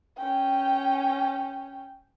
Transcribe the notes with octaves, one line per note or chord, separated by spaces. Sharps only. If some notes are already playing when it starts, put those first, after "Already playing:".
C#4 G5